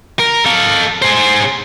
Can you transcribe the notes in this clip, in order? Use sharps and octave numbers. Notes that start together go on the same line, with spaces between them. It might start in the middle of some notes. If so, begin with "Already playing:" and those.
A#4
A4 F5
G#4 C5